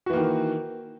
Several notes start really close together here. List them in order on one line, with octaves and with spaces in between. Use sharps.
F#4 E3 A#3 D#3